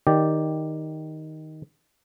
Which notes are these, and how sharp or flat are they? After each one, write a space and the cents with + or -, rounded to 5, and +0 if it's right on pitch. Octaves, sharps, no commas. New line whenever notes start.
D#3 +5 G4 +0 D5 +0